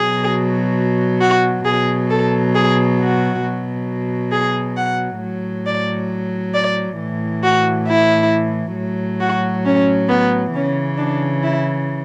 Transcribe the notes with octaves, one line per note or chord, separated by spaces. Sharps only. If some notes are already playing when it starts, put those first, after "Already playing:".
Already playing: B2 F#3 G#4
F#4
B2 F#3 G#4
A4
G#4
F#4
B2 F#3
G#4
F#5
A2 F#3
D5
D5
A2 E3
F#4
E4
A2 F#3
F#4
C#4
B3
C#3 E3 C#4
D4
E4